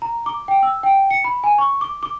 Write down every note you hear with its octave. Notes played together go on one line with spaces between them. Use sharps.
A#5
D6
G5
E6
G5
C#7
B5
G#5
C#6
D6
D6